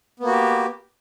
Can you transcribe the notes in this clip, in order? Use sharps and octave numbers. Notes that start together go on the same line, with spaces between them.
A#3 B3 F#4 G4